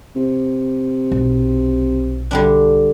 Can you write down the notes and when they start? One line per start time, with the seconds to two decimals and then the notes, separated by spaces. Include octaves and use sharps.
0.16 C3
1.12 B1
2.31 D3 G3 D4